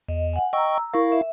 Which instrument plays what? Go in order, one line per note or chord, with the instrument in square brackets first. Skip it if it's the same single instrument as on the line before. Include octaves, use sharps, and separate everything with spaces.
[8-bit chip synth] E2 [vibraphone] D#5
[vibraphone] F#5 G#5
[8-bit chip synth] D#5 G5 C#6 [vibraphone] A#5 E6
[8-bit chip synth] E4 F5 [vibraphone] A#4 C#6
[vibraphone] E5